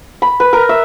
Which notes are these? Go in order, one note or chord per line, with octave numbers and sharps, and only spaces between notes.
B5
B4
A#4
E5